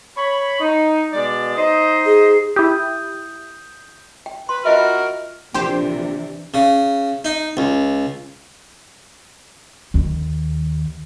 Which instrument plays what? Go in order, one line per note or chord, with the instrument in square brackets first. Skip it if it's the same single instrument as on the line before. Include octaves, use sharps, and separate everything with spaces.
[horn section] C#5 B5
D#4
B2 G#3 D5
D#4 C5 D#5
[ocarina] G#4
[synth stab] E4 G4 [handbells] D#6 G6
[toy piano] G5
[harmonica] B4 [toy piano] C6
[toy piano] F4 D#5 E5 [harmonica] F#4 A#4 F6
[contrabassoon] A#1 [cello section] C3 E3 [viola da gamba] D4 [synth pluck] G4 C5
[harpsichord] C#3
D#4
C#2
[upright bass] D#2